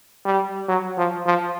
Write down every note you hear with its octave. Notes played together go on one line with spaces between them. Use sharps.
G3
F#3
F3
F3